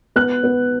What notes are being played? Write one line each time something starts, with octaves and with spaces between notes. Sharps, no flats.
B3 F#6
B3